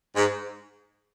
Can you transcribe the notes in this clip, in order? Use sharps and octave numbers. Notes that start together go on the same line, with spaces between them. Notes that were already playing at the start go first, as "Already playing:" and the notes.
G#2